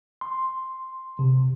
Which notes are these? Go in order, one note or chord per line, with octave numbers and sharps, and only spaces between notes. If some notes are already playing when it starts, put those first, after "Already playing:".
C6
C3